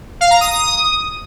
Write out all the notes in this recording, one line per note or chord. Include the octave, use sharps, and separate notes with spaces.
F5
A#5
D#6
D#6